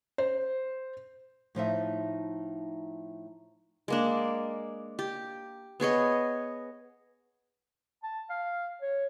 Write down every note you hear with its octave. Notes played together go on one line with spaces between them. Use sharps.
C5
A2 F3 D#4 E5
G#3 A#3 D4
G4
B3 G#4 C#5 D#5
A5
F5
C#5